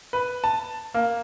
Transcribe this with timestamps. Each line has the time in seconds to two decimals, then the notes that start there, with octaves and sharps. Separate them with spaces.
0.13 B4
0.44 A5
0.94 A#3